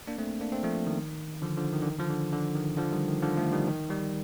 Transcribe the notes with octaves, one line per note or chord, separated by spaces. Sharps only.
A#3 D4
A3 C4
A#3 D4
A3 C4
F3 A3
D#3
D3 F3
D3 F3
D#3
D3
D#3
D3 F3
D3
D3
D#3
D3 F3
D#3 G3
D#3
D3 F3
F3 A3
D#3 G3
D#3
D#3 G3